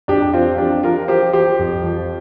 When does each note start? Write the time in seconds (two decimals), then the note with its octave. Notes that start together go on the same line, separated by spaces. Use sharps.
0.08 F2 D4 G4
0.33 F3 C4 F4
0.58 F3 D4 G4
0.83 F3 F4 A#4
1.08 F3 G4 C5
1.33 F3 G4 C5
1.59 F2
1.83 F3